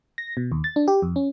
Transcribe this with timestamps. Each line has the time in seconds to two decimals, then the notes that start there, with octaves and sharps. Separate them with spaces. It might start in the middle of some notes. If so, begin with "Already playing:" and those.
0.18 A#6
0.37 B2
0.52 D#2
0.64 A6
0.76 D4
0.88 G4
1.02 F2
1.16 C#4